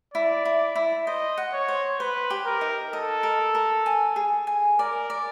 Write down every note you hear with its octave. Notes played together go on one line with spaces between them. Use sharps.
E4 D5
E4
E4
C5 D#5
F#5
C#5
C5
B4 C5
G4
A#4
D#4
A4 D#5
A#4
A#4
G#5
G#4
G#5
A#4 D5
D5